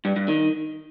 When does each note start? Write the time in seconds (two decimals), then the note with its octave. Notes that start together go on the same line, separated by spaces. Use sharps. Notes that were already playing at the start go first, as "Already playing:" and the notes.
0.05 G2
0.16 G2
0.28 D#3